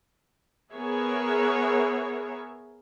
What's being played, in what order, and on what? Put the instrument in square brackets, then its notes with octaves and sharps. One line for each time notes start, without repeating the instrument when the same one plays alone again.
[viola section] B3 G#4 A#4 C#5 E5